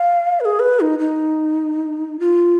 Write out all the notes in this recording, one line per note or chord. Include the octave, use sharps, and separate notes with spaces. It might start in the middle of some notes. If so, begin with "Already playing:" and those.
Already playing: F5
B4
G#4
B4
D#4
D#4
F4